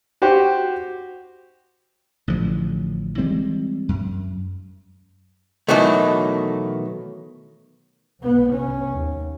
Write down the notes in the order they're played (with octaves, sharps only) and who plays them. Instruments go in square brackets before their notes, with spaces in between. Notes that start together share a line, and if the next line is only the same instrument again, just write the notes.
[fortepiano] F#4 G4 C5
[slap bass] A1 D3 F3
E3 G3 G#3 C4
F#2
[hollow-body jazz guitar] B2 D#3 E3 F#3 A3
[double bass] B1 B3
C2 C#4
D#2